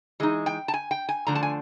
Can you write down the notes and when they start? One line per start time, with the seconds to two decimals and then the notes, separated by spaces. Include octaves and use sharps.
0.20 E3 G#3 D#4
0.46 G5
0.68 A5
0.74 G#5
0.91 G5
1.09 G#5
1.27 D3 F3 A3 D4 A#5
1.35 A5
1.43 G#5